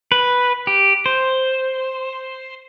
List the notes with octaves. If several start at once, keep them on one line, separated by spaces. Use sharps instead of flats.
B4
G4
C5